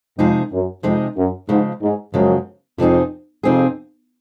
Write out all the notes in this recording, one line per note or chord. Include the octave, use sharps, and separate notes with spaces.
F2 C3 F3 G#3 D#4 G#4
F#2
F2 C3 F3 G#3 D#4 G#4
F#2
G#2 C#3 F3 G#3
G#2
F#2 C#3 F3 G#3
F2 C3 F3 C4 D#4 G#4
F2 C3 F3 C4 D#4 G#4